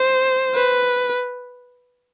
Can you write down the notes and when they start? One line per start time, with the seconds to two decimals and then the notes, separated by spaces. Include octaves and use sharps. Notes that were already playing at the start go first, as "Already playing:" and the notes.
Already playing: C5
0.55 B4